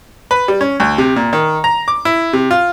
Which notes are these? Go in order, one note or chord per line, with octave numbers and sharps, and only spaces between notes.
B4
G3
C#4
D2
C3
A#2
D#3
A#5
D6
E4
C3
F4